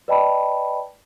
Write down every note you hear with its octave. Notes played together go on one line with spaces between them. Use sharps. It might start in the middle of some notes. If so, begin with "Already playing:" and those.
B4 D5 D#5 G5 A5 B5